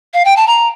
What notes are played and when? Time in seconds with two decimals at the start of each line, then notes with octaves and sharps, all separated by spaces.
0.14 F5
0.25 G5
0.37 A5
0.47 A#5